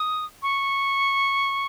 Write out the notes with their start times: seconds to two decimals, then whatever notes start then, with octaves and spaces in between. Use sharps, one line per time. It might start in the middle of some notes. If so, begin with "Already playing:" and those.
Already playing: D#6
0.43 C#6